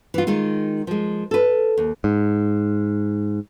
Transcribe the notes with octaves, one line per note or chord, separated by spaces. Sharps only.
E3 F4
D#3 G#3 D#4 F4
F3 G#3
A4 B4
D#2
G#2